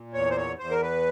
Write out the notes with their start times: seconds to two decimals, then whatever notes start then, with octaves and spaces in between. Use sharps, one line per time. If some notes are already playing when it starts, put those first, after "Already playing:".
Already playing: A#2
0.13 E2 C#5
0.30 C5
0.37 C#5
0.59 E2 C5
0.71 A#4
0.82 B4